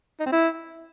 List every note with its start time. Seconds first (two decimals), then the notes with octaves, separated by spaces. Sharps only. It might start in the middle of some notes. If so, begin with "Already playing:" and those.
0.20 D#4
0.26 C4
0.32 E4